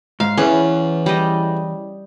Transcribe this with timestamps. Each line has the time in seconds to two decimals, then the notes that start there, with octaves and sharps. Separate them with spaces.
0.20 G#2 F5
0.38 E2 E3 C#4
1.06 G3 D#5